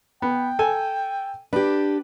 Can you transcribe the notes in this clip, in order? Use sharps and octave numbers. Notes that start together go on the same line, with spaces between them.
B3 G5
A4 G#5
D4 G4 B4